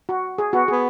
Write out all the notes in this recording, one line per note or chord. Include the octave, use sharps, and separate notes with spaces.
F#4
G#4
B3 F#4
B3 G#4